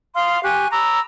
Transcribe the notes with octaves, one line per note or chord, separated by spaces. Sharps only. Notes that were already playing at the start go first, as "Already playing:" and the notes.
F5 C6 D#6 F6
G4 G#5 C#6 F#6
A#5 B5 D6 E6